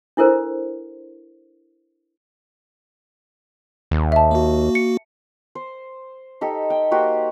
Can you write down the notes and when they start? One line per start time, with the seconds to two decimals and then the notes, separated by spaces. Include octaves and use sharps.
0.17 D4 E4 A4 A#4 C5
3.91 D#2
4.12 E5 A5
4.31 A#3 F#4
4.75 C#7
5.55 C5
6.41 D#4 G4 A4
6.70 G5
6.91 A#3 F#4 G4 C5